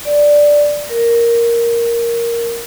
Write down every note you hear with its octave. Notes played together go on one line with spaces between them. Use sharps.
D5
A#4